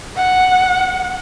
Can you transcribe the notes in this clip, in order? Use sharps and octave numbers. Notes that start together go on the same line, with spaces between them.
F#5